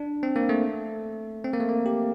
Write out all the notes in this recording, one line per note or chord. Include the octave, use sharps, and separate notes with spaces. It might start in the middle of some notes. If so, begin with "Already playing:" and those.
Already playing: D4
C4
A#3
A3
C4
A#3
A3
A#3
G4